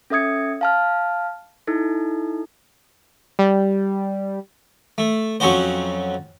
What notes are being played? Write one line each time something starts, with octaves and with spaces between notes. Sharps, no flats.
C#4 A4 E5 D#6 G#6 C#7
F5 A5 F6
D#4 E4 A4
G3
A3
F2 F#3 C#4 F#4 C5